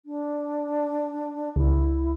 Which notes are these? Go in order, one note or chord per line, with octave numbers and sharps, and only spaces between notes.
D4
C#2 E4